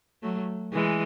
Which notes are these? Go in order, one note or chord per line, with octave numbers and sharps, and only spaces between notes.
F#3 A3
E3 G#3